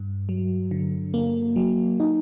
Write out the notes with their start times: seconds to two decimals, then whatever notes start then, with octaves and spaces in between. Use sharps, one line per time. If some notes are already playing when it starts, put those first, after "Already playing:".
Already playing: G2
0.29 F#3
0.71 D3
1.14 A#3
1.56 F#3
2.00 D#4